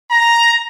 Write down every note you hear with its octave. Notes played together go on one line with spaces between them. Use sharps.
A#5